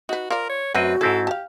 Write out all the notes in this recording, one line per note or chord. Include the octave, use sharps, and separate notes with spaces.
D#4 F#4 B4
F4 A#4 C5 D5
C#5
F#2 A3 C4 F#4 B4 D#5 F#5
G#2 C4 E4 G#4 A4 A5
G4 F5 A5